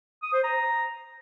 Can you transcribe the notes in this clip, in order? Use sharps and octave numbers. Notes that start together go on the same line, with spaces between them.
D#6
C5
A#5